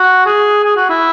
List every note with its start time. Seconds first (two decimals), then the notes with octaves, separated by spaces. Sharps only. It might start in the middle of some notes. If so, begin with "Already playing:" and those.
Already playing: F#4
0.26 G#4
0.64 G#4
0.77 F#4
0.90 E4